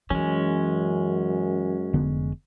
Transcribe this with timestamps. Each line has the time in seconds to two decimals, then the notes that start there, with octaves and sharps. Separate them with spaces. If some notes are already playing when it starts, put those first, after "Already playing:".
0.10 F#2 E3 G#3 C#4
1.93 F1 D3 B3